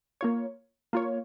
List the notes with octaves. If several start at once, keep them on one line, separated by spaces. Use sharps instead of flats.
A#3 F4 C#5
A#3 F4 C#5